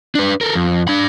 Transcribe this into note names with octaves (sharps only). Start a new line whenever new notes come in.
D4 B4
A4 A#4
F2
D4 B5